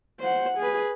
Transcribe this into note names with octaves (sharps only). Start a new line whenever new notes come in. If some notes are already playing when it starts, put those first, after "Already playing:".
C5 F#5
G#4 B4